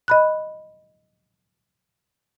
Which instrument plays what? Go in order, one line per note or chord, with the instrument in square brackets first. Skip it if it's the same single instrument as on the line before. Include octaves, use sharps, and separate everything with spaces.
[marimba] D#5 B5 F#6